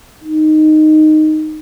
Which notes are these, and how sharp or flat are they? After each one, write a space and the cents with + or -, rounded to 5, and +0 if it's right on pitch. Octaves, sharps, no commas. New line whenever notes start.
D#4 -10